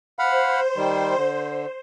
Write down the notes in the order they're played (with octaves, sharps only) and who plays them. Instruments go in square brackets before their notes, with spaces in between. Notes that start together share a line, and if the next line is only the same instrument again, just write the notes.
[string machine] C5 [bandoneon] F5 F#5 B5
[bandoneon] D#3 G3
D3